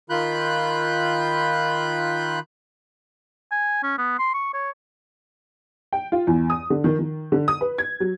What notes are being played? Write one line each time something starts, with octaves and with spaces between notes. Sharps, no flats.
D#3 F4 B5 F#6 G6
G#5
C#4
B3
C6
C#6
C#5
G5
F4
E2
D#6
D3
D#3
D#3
D3
D#6
B4
G#6
F#3